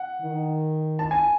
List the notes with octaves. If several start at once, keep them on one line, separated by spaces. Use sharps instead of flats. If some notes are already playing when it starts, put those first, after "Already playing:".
Already playing: F#5
D#3
A5
G#5